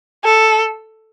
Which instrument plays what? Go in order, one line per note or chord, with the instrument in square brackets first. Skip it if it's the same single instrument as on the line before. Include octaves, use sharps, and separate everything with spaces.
[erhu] A4